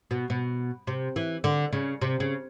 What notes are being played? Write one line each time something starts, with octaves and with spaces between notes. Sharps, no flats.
B2
B2
C3
E3
D3
C#3
C3
C#3